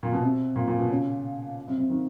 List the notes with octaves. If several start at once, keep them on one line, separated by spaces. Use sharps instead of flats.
A#2
B2
C3
A#2
A#2
B2
C#3
C3
C3
D#3